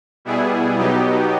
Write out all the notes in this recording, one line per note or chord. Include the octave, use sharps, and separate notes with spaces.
B2 G3 B3 E4 G#4
B2 F#3 B3 D#4 G4